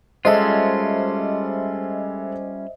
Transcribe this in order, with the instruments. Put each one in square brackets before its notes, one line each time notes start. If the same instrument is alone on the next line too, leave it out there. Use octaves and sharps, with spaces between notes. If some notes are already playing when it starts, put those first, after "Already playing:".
[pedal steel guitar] G3 C#4 F4 [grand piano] G#3 A4 [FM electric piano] C5 D#5 E5